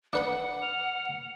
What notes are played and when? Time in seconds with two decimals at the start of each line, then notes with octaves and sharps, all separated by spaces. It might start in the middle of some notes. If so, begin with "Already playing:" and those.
0.13 D4 B4 F#5 B5
0.62 F6